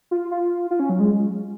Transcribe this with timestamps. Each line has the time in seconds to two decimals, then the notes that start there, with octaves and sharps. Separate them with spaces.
0.11 F4
0.31 F4
0.71 F4
0.80 C#4
0.89 F#3
1.00 G#3